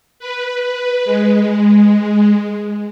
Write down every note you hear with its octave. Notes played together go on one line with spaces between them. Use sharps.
B4
G#3